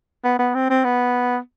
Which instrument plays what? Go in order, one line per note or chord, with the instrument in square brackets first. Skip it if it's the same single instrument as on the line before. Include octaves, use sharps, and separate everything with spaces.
[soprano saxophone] B3
B3
C4
C4
B3